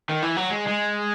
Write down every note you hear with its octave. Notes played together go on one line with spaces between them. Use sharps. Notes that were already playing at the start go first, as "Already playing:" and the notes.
D#3
E3
F#3
G#3
G#3